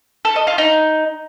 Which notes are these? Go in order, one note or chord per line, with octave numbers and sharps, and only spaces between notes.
A4
D#5
F4
D#4